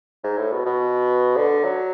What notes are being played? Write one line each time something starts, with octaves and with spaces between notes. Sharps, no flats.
G#2
A2
B2
B2
D3
F#3